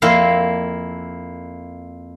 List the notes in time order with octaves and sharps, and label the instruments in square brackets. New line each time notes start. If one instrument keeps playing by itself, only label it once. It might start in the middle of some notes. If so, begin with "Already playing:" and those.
[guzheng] F2 A#3 E4 F5 C6